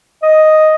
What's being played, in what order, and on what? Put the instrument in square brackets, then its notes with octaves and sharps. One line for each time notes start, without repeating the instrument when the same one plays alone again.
[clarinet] D#5